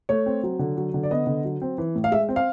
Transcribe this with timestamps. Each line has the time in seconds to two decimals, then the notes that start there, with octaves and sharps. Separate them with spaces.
0.09 A3 C#5
0.26 C4
0.43 F#3
0.59 D3
0.77 F#3
0.94 D3
1.03 D5
1.11 B3 D#5
1.27 D3
1.45 F#3
1.62 C4
1.78 E3
1.95 A2
2.04 F5
2.12 G#3 E5
2.29 C4
2.36 F5